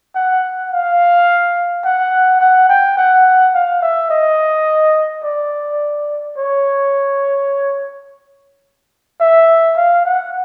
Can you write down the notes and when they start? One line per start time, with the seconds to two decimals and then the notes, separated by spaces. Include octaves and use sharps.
0.15 F#5
0.72 F5
1.85 F#5
2.40 F#5
2.69 G5
2.98 F#5
3.55 F5
3.82 E5
4.10 D#5
5.24 D5
6.38 C#5
9.21 E5
9.77 F5
10.05 F#5